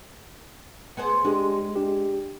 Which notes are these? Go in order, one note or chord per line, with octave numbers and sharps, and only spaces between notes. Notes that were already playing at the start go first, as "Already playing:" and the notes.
B3 G#4 C5
G#3 D4 G4 G#4
D4 G4